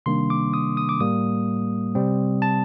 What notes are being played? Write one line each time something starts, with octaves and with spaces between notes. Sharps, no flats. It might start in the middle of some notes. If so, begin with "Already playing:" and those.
C3 D#3 G3 A#3 D4 C6
D6
D#6
D#6
D6
A2 G3 A#3 D#6
C3 G3 C4
A5